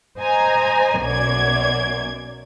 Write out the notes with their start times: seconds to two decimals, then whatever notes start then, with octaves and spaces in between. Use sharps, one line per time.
0.19 C5 D#5 G#5 A#5
1.02 B1 F#2 B2 D5 G#6